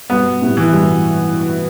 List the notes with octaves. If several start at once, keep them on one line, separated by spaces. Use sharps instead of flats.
G2 B2 B3
A2 C3
E3
G2 B2